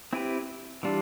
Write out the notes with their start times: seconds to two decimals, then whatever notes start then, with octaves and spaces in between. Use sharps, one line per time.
0.13 C4 E4 G4 B4
0.83 E3 G3 D4 F4